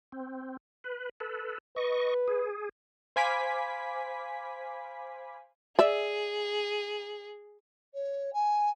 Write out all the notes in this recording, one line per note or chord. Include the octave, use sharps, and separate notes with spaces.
C4
B4
A4 B4
B4 D#5 C#6
G#4
C5 F5 G#5 B5 D6 B6
G#4 D5 E5
C#5
G#5